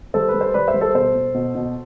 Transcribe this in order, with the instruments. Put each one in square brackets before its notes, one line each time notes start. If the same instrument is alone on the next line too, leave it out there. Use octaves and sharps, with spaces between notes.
[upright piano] G3 A4 C5
B4
G3
C5
G3 B4 D5
C5 E5
G3
A4 C5
B2 A4 C5
B2
B2
B2